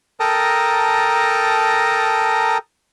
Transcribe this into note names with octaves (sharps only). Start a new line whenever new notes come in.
A4 A#4 G5 A5 A#5 D#6